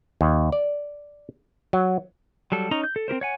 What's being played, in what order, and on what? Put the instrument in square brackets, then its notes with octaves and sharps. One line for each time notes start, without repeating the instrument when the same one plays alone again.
[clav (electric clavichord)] D#2
D5
F#3
[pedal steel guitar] F#3 G3 A4
C#4 D#4 C#5 A#5
G6
A4
C4 G4 A#4 C5
C#5 F#5 G#5